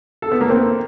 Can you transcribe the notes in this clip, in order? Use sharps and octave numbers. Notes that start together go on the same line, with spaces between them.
A4
B3
A#3
C4